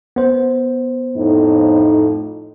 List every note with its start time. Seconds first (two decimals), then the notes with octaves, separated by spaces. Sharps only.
0.16 B3 C5
1.16 F2 A2 D#4